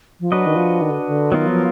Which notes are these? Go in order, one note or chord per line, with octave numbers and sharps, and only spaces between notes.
F3
F#3 D4 F#4 B4 D#5
D#3
F3
D#3
D3
D3
D#3 F#3 B3 F4 A#4
F3